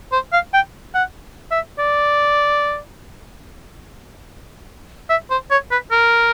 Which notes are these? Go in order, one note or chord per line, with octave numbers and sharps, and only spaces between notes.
C5
F5
G5
F#5
E5
D5
E5
C5
C#5
B4
A#4